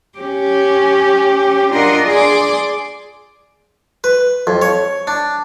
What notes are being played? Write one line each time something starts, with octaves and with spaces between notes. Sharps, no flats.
C#4 G4
D4 F4 A#4 D#5 F#5
G#4 D5 C6 D6
B4
F2
C#5
D4